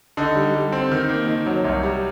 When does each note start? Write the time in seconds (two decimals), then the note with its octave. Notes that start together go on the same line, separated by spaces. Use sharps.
0.17 D3 D#4
0.35 G3
0.55 G3
0.72 C4
0.91 D#3
1.09 A#3
1.27 D#3
1.46 F#3
1.64 C2
1.83 G3